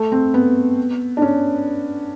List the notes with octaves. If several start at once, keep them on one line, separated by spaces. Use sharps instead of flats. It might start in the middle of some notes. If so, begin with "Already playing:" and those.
Already playing: A3
C4
B3
D4
C#4